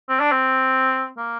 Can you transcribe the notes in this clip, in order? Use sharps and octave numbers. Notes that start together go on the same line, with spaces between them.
C4
D4
C4
A#3